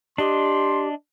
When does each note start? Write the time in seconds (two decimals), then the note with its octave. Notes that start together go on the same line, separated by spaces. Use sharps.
0.18 D4 G4 D#5 C6